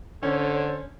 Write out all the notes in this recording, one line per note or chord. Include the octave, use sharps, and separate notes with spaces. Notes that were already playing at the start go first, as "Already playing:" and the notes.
D3 C#4 A4 C5 C#5